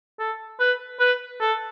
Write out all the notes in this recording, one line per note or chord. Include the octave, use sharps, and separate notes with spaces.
A4
B4
B4
A4